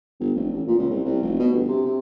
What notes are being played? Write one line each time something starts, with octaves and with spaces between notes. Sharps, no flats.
G1
F1
A1
A#2
C#2
C2
C2
F1
B2
G1
C3
C3